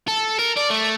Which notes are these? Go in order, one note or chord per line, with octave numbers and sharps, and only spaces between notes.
A4
A#4
D5
A3